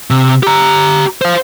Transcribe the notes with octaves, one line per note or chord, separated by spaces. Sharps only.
C3
G4 A#5
C5 F5